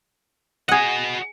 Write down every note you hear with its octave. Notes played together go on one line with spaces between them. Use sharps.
F#4 G#4 D#5 F#5